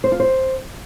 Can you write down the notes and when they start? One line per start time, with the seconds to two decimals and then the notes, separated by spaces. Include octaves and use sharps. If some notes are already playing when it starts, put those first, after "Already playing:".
0.04 C5
0.12 F4
0.20 C5